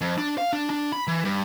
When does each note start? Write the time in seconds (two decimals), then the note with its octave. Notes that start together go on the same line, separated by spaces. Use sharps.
0.01 F2
0.18 D4
0.38 F5
0.53 D4
0.70 D4
0.92 B5
1.07 E3
1.25 G2